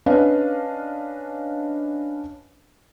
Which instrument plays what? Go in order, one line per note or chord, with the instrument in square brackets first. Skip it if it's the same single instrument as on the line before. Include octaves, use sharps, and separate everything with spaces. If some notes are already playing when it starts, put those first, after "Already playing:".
[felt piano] C#4 D4 B4 D#5 F5